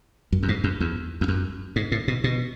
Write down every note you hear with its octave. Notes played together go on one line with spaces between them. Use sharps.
F#2
F#2
G#2
F#2
E2
E2
F#2
G#2
A2
B2
B2